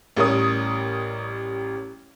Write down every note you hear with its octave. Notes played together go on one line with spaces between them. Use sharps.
A1 G3 A#4 C#5 D#6